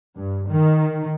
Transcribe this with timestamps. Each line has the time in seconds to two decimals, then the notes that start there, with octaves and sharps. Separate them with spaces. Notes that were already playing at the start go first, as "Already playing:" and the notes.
0.16 G2
0.49 D#3